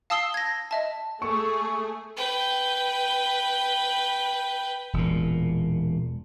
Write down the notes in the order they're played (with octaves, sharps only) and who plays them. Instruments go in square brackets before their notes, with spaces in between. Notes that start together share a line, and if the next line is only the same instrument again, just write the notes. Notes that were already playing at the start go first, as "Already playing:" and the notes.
[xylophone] F5 A5 D#6 E6 C7 G7
G#6 A#6
D#5 E5 A5
[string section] A3 G#4 [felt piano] C#6
[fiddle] B4 G5
[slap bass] E1 A#2